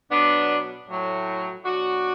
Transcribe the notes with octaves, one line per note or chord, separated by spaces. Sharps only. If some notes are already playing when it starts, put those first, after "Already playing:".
B2 F#3 B3 D4
A2 F#3
B2 F#3 D4 F#4